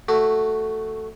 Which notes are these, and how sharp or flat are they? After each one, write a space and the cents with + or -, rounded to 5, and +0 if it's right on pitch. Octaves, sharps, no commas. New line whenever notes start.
A3 +0 F#4 +5